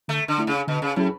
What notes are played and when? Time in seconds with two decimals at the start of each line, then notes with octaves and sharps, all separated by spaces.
0.08 D3 A3
0.28 D3
0.38 A3 E4
0.47 C#3
0.67 B2 D3
0.82 C#3
0.96 A2 F#3 C#4 E4 G#4